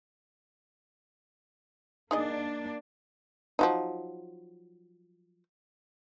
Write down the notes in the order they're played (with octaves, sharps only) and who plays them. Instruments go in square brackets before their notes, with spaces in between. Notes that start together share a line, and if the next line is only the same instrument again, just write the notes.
[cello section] A#3 D4 [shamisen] D#4 G#4 D#5
[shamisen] F3 F#3 D#4